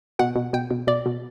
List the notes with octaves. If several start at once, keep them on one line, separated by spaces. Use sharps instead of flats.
B2 F#5
B2
B2 G5
B2
B2 D5
B2